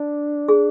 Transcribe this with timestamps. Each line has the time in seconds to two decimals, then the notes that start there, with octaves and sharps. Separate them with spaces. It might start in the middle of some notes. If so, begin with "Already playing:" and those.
Already playing: D4
0.48 G#4